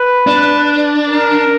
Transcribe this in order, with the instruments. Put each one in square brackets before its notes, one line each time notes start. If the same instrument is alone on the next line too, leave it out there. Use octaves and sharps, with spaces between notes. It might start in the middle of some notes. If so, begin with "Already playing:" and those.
Already playing: [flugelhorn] B4
[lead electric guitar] D4
[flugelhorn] A#4